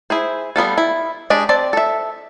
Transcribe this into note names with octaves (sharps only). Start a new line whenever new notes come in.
E4 G#4 C5
G3 B3 F4 A4
E4
G#3 D4 G4 D#5
C4 D5 A5
A4 E5